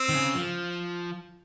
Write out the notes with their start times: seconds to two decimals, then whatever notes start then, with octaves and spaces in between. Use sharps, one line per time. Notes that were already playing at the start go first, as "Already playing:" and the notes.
Already playing: C4
0.09 D#3
0.15 C#3
0.35 F3